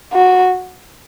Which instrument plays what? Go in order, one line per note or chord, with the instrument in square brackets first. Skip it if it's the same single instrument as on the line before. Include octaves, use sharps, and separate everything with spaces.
[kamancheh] F#4